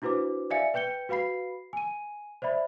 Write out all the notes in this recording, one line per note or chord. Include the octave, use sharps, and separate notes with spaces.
D4 E4 F#4 B4 C5 D6
D5 E5 F5 G#5 C#7
B4 G5 G6 C#7 G7
F#4 B4 F5 B5 C7
G#5 D#7
C5 D5 E5 B5